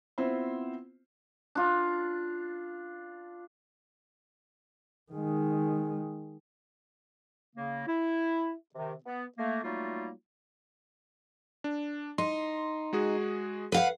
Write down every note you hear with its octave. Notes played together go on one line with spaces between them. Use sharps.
B3 C4 E4 F4 C5
D4 F4
D#3 G#3
C#3 A#3
E4
C3 D#3
B3
A3 A#3
F#3 G3 A3 A#3 D#4 F4
D4
D#4 C6
G#3 F#4 G#4
B4 F5 F#5